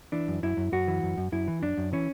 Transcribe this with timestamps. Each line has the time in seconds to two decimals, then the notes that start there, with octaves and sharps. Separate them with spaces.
0.12 E3 D4
0.28 F#2
0.43 F#2 E4
0.57 F#2
0.72 F#2 F#4
0.88 E3
1.03 F#2
1.17 F#2
1.32 F#2 E4
1.48 E3
1.62 F#2 D4
1.77 F#2
1.93 E3 C#4